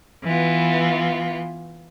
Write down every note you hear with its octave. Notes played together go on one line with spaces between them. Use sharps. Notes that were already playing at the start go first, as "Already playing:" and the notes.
E3 B3 F4